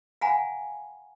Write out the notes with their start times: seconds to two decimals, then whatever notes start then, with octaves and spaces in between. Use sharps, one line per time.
0.21 F5 F#5 G#5 A#5 B5